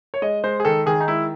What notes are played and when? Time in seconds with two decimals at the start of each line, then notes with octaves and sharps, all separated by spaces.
0.14 C#5
0.22 G#3 D#5
0.44 G#3 C5
0.60 G#4
0.65 D#3 A4
0.86 D#3 G#4
1.00 D#4
1.08 G#3 E4